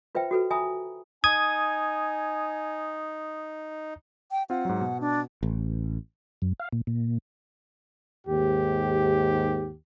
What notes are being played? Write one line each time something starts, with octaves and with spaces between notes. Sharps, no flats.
F4 B4 C5 E5 G5
F#4 A4 B4
E5 G#5 A#5 B5 D#6
D#4 G#5 D#6 G#6
G5
C4 F4 F#5
G#2 F#3
B2
D4
A1
F#2
F5
A#2
A#2
D#2 G#2 G4